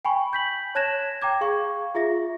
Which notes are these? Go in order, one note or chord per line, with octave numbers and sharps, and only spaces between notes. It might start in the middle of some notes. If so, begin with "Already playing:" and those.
G5 G#5 B5 C#6
G6 B6 F#7
C#5 A5 F#6 G#6 A#6 E7
G5 A#5 D6 G#6
G#4 F5 C#6
F4 G#4 E5 A#6